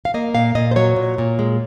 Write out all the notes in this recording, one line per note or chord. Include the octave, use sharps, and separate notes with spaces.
F5
A#3 D#5
A#2 F5
A#2 D#5
C5
F#3 C#5
A#2
A#2
G#3